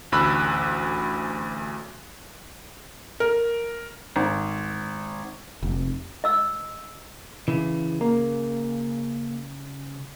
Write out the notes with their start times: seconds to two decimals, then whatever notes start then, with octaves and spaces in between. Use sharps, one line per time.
0.12 A1 D2 B5 E6 F#6
3.20 A#4
4.16 G#1
5.63 F1
6.24 D#5 E6
7.48 C#3 E3
8.01 A#3